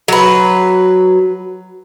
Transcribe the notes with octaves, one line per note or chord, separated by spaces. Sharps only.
F#3 B4